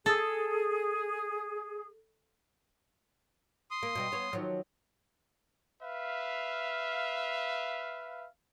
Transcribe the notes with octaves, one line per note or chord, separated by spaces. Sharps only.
G#4 A4
C6 D#6
A#3
B2 G3 D#5
B3 C#5
D#3 F3 F#3
B4 E5 F5